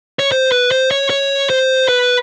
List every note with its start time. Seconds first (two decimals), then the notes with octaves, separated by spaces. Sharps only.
0.19 C#5
0.32 C5
0.52 B4
0.72 C5
0.91 C#5
1.10 C#5
1.50 C5
1.89 B4